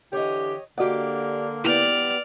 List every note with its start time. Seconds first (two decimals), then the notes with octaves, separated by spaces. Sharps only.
0.13 D3 E3 G4 C#5 D#5
0.78 D3 A#3 F#4 G4 D5 D#5 F#5
1.65 B3 E4 G4 D5 F6